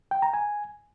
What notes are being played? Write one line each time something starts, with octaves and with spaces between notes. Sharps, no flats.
G5
A#5
G#5